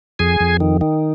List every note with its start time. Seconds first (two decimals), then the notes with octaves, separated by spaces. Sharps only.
0.19 F2 G#4 G#5
0.40 F2
0.60 D#3
0.81 D#3